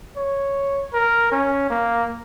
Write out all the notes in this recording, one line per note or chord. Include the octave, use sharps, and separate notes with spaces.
C#5
A#4
C#4
A#3